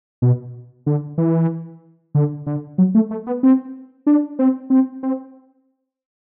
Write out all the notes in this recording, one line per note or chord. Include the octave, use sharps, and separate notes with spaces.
B2
D3
E3
D3
D3
F#3
A3
A3
B3
C4
D4
C4
C4
C4